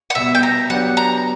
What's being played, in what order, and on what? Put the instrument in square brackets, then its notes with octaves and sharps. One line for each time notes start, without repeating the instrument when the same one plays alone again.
[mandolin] F#5
[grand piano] B2 G3 B3 [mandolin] E5
[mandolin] G5
A#5
[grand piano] F#3 B3 D4 G4 [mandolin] F#5
[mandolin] A#5